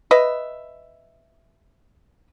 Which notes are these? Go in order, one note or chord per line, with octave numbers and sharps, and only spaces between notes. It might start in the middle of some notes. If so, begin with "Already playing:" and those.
B4 D#5 E5